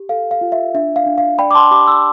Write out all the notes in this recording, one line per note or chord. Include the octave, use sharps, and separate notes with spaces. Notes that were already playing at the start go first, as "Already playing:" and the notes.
Already playing: G4
A4 F5
F5
F4
E5
D4 E5
F5
D4
F5
D5 G5 B5
D6
A5 C6
G4 B5 D6
C6 E6